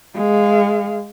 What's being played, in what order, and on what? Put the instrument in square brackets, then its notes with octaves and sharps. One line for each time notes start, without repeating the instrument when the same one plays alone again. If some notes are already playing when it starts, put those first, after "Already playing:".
[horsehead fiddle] G#3 F5